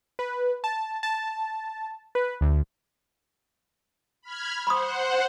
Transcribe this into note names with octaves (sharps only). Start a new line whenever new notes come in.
B4
A5
A5
B4
D2
B5 F6 G#6
C5 F#5 B5 C6 D#6